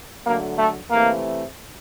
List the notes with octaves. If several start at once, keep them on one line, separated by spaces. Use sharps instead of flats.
D3 F#3 A3 A#3
A3
C3 E3 A3 A#3